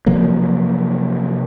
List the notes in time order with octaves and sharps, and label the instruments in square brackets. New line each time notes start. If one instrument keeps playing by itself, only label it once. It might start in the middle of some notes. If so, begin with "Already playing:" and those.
[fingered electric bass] C3 F3 F#3 A#3